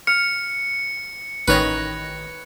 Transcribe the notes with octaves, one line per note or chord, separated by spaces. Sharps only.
F6 C#7
A1 D#3 B4 C#5 A#6